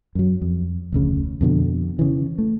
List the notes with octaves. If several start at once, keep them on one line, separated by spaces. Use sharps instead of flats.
F#2 F#3
F2
F1 D2 C#3
F2 B2 D3
C#3 E3
A3